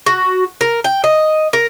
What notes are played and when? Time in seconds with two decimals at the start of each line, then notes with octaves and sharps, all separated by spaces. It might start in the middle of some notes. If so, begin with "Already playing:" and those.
0.06 F#4
0.61 A#4
0.84 G5
1.04 D#5
1.53 A#4